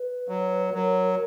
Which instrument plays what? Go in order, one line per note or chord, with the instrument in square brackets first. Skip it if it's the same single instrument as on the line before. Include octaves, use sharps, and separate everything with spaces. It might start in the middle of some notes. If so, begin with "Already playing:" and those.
Already playing: [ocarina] B4
[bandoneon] F#3
[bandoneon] F#3 [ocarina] A#4